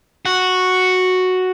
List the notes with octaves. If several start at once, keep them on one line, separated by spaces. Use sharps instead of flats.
F#4